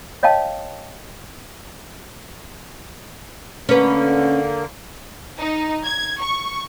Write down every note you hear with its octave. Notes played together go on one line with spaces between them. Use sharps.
C#5 D#5 F5 G5 A5
D3 A#3 C#4 B4
D#4
G#6
C#6